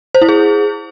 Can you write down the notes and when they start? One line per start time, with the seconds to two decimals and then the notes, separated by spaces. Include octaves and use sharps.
0.15 C5
0.22 E4
0.29 G#4